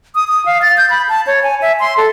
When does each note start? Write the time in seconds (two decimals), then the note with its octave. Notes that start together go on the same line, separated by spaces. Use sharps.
0.15 D#6
0.28 D#6
0.46 F5
0.62 A6
0.77 G6
0.90 B5
1.09 A5
1.27 C#5
1.43 G#5
1.62 E5
1.80 C6
1.97 A4